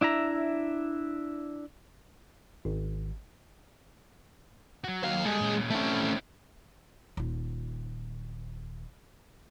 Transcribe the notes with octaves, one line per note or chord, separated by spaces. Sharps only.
D4 E4 E5 A#5
G#1
F#3 F#4
D#2 F5
G3 G#3 A4
A#2 C#4
A3 C4 C#4 E4
D#1 F4